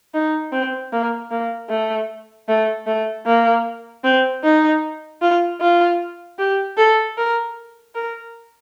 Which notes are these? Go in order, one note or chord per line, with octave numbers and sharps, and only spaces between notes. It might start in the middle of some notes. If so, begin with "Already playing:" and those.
D#4
C4
A#3
A#3
A3
A3
A3
A#3
C4
D#4
F4
F4
G4
A4
A#4
A#4